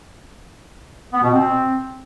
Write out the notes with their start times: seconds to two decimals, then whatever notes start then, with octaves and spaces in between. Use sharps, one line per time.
1.12 B3
1.22 B2
1.32 C4